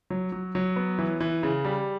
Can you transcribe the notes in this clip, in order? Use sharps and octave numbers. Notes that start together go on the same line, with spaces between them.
F#3
F#3
F#3
B3
E3
E3
C#3
G3